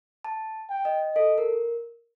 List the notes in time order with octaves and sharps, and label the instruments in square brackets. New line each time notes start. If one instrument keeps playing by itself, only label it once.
[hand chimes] A5
[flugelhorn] G5
[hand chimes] D#5
[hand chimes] A4 [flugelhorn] D#5
[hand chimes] A#4